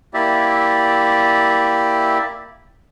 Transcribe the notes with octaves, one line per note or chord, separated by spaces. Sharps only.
A#3 E4 G4 D5 E5